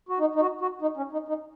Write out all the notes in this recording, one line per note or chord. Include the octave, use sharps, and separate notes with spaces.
F#4
D#4
D#4
F#4
F#4
D#4
C#4
D#4
D#4